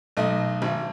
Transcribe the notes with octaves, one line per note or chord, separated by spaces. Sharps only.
B1 A3 D#5
G#1